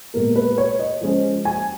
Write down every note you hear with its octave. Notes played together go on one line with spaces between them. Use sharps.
A#2 G#3 B3 A#4
B4
C#5
D#5
F3 G#3 C#4
G#5